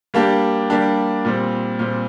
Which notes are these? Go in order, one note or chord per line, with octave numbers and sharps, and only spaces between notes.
G3 A#3 D4 G4
G3 A#3 D4 G4
A#2 G3 C4
A#2 G3 C4